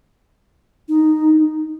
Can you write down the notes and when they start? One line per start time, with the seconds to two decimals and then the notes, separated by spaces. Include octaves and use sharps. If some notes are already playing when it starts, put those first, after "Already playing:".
0.88 D#4